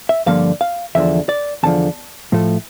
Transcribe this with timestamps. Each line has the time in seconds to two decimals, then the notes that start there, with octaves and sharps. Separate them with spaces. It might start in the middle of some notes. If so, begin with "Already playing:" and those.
0.09 E5
0.26 G2 D3 F3 A#3 F5
0.61 F5
0.95 E2 D3 F3 E5
1.29 D5
1.63 E2 D3 F3 A5
2.32 A2 F3 A3